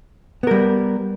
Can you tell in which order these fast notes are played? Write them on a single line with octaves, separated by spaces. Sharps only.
B3 A#4 G3